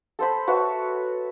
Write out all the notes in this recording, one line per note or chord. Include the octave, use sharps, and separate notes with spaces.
A4 C5 B5
F#4 B4 C#5 E5